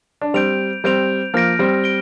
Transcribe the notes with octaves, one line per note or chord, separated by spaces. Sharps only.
D4
G3 C4 G6 D7 F7
G3 C4 G6 D7 F7
F3 A#3 F6 A#6 D7
G3 C4
D7 G7